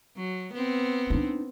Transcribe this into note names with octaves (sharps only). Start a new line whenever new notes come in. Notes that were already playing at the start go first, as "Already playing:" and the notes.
F#3
B3 C4
D4 D#4